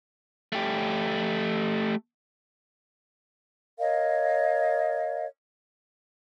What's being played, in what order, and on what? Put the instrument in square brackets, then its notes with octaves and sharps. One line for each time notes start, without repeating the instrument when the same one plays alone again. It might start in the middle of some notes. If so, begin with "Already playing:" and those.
[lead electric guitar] A3 G4
[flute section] A#4 C#5 D#5 F5